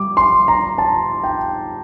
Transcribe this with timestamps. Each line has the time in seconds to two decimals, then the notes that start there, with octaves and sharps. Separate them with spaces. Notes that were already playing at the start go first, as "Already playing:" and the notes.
Already playing: G3 D6
0.17 C6
0.48 A#5
0.78 A5
1.24 G5